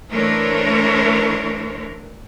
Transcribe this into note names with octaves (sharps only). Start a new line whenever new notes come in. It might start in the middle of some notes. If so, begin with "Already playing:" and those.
E3 A3 D4 A#4 C5 C#5